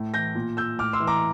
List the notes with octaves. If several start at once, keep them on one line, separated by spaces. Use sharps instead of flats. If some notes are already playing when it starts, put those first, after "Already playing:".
Already playing: A2
E3 G6 A#6
A#2
E6 G6
A2 D6 F6
C6 E6
E3
A#5 D6